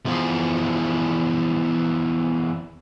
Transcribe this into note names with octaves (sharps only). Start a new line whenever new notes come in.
E2 F3